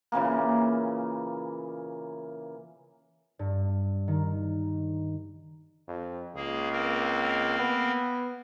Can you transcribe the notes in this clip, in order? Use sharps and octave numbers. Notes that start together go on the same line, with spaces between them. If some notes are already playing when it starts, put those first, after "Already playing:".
A#2 C#3 E3 A#3
G2
D#3
F2
C#2 A#3 G#4
A#3 C4 A#4
B3